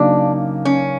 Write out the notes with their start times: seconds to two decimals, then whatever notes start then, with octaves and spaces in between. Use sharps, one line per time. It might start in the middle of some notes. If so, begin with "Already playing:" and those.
Already playing: C#3 F#3 A#3 D4 D#4
0.65 C#4